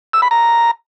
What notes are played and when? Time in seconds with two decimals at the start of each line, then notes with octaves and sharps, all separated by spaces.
0.13 E6
0.22 B5
0.31 A#5